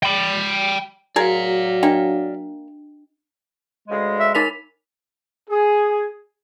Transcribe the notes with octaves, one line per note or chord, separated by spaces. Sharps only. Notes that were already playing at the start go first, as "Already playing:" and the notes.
G5 B5
F#3 F#4 G#4 A#4 D5 F5
A#3 D4 D#5 G5
D2 C#3 G#3
E5
D#4 A#4 B5 F7
G#4